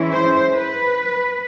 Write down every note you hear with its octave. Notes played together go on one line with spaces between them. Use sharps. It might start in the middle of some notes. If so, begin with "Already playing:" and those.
Already playing: E3 G#3 C#4 E4
C5
B4